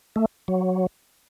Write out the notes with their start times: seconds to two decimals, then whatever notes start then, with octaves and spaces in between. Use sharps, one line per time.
0.16 A3
0.48 F#3